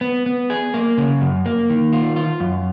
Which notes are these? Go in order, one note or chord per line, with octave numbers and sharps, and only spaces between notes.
B3
B3
G#4
A#3
C#3
F#2
A#3
D#3
F4
F4
F#2